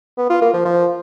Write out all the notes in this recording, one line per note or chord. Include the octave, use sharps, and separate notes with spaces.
B3
F4
A#3
F3
F3